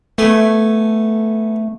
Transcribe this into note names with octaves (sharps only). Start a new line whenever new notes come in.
A3 B3 A4 G#5